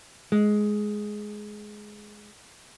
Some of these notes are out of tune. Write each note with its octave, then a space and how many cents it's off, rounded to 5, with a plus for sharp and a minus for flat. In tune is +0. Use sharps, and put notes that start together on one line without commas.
G#3 +10